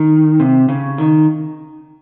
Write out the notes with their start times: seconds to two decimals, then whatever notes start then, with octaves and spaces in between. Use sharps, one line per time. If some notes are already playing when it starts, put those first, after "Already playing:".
Already playing: D#3
0.40 C3
0.69 C#3
0.98 D#3